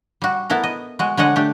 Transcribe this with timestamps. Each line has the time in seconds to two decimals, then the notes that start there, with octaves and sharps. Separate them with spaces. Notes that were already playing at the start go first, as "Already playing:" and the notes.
0.22 G3 F#4
0.50 B3 E4 A4 A#4
0.64 D#5
0.99 G#3 F#4
1.17 D3 G#3 C#5 D#5 F#5
1.36 A3 D4 G4